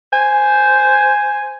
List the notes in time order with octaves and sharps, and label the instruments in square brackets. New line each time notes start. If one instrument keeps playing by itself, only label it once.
[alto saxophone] C5 [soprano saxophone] G#5